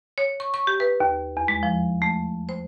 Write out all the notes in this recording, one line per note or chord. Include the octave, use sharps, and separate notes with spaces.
C#5
C#6
C#6
G4
B4
D#2
E2
G#3
F3
A3
C5